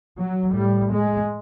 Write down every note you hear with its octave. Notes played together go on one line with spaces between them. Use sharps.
F#3
A2 G3
G#3